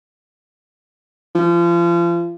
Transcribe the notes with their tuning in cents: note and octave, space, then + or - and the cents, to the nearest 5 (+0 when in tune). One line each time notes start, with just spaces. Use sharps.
F3 -35